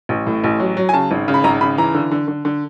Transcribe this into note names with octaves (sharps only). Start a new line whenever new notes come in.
A1
A2
A1
F#3
F#3
G#5
C#3 A5
G#1
C#3
B5
G#1 A#5
C#3 B5
E3 A#5
D3
D3
D3
D3